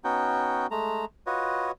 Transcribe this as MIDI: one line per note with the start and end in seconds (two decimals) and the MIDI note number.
0.04 0.67 59
0.04 0.67 61
0.04 0.67 63
0.04 0.67 66
0.04 0.67 79
0.71 1.05 56
0.71 1.05 57
0.71 1.05 82
1.27 1.71 65
1.27 1.71 66
1.27 1.71 71
1.27 1.71 73
1.27 1.71 75